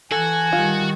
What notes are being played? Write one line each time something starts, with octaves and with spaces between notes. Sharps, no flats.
E3 F#4 A4 G#5
D#3 G3 F4